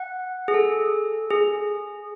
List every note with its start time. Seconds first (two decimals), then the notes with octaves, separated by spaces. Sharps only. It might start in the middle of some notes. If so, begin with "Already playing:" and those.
Already playing: F#5
0.48 G#4
0.54 A4
1.30 G#4